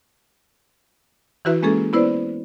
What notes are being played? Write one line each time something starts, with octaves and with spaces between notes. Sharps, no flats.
E3 E4 F#4 B4 E5
G#3 A#3 C#4 G#4 A4
B3 E4 B4 C5 D5